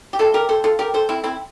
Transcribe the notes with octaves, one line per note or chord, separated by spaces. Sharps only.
G4
C3 G3 C4 F4 A4
G4 A#4
A4 C5
F4 A4
G4 A#4
A4 C5
C4 E4
C4 E4